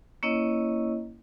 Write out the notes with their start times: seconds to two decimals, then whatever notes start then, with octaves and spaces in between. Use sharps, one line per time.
0.23 A#3 C#4 E4 C#5 D#5